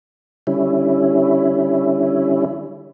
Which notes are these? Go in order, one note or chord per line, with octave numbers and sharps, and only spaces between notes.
D3 G3 C#4 E4